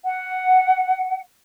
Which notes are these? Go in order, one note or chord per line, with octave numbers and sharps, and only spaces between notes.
F#5